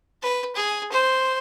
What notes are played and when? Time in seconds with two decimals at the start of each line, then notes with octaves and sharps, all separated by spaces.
0.22 B4
0.56 G#4
0.92 C5